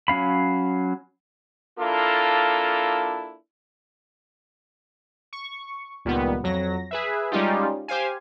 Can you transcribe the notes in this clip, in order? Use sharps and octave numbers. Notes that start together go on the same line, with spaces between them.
F#3 C#4 F5 B5
A#3 D4 E4 F4 A4
C#6
C#2 A#2 D#3 G3 B3
F2 F#3 A#6
G#4 B4 E5
G3 G#3 C#4 D#4 F4 G4
G4 C5 F5 G#5